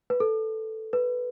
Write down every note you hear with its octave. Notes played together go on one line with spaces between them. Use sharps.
B4
A4
B4